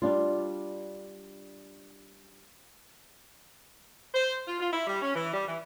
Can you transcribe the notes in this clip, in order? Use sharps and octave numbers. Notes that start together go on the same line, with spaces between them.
G3 D4 F4
C5
F4
F4
E4
G3
C#4
E3
G3
E3